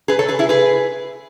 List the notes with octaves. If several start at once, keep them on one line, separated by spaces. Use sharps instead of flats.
G#4 B4
A4 C#5
G#4 B4
E4 G#4
G#4 B4